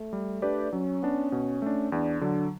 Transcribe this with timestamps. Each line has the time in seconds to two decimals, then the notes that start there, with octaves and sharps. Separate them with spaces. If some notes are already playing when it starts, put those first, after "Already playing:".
Already playing: A3
0.13 G3
0.42 D4 G4 B4 D5
0.72 F#3 C#4
1.03 B3 D4
1.32 B2
1.62 A3 D4
1.92 E2 D4
2.21 D3 F#3 D4